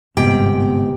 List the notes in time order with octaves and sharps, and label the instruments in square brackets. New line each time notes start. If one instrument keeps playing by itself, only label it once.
[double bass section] G1 [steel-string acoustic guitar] G#2 G5 [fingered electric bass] C3 A#3 B3 [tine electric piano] G4